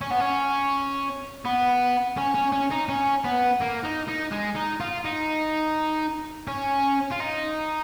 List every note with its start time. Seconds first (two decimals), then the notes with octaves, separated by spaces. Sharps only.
0.01 C#4
0.11 B3
0.20 C#4
1.45 B3
2.17 C#4
2.34 C#4
2.52 C#4
2.71 D#4
2.89 C#4
3.24 B3
3.61 A#3
3.84 D#4
4.08 D#4
4.32 G#3
4.56 D#4
4.80 F4
5.05 D#4
6.47 C#4
7.11 F4
7.20 D#4